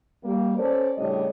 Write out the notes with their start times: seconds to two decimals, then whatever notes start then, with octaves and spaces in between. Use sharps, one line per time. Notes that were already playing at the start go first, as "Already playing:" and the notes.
0.24 G3 A#3
0.58 C#4 A4 C5 D5
0.98 A2 C#3 G3 D4 C#5 D#5